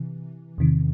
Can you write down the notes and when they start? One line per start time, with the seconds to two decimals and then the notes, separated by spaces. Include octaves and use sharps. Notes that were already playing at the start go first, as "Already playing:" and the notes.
Already playing: C3 E3
0.58 E2 C3 D#3